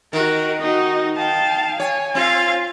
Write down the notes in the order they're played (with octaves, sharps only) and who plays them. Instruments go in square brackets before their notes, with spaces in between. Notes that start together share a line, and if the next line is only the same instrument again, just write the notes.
[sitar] D#3 [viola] F#4 A#4
[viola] D#4 [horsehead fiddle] F#4 D#5
[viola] F5 [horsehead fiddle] G5 A5
[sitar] C#5 [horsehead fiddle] G#5
[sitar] C4 [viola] F4 F5